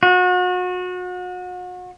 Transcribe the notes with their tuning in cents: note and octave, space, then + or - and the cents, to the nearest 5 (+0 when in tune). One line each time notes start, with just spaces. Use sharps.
F#4 -35